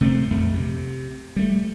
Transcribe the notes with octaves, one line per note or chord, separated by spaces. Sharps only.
C3 A3 B3 C4
A#1 F2 A3
C3
G3 A3